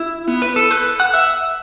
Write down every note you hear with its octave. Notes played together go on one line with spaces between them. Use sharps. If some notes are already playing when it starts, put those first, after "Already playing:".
Already playing: E4
B3
B4
A4
B4
F#5
E5